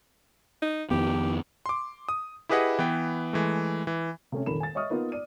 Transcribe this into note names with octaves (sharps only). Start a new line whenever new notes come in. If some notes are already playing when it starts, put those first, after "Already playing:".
D#4
F2 D#3 B3 G4
C6 D6
D#6
E4 G4 G#4 B4 D#5 F#5
E3 B3 G5
E3 G#3 A3
E3
C3 A3 C#4
D#1 F2 D#3 A#4 B5 E7
G#5 A6
C#5 D#5 E5 C#6 D#6 F6
A#3 B3 D#4 F4
D5 D#7